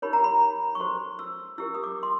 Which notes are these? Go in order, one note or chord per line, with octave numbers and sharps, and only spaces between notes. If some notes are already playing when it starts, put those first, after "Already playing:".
D#4 G4 A#4 C#5 B5
A#5
B5
C#6
F#4 A4 C5 C6
E6
E4 G4 A#4 E6
D#6
D6
C6